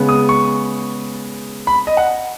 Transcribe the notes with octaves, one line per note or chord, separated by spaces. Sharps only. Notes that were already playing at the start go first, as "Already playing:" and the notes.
Already playing: C#3 G#3 B3
D#6
C#6
B5
D#5
F#5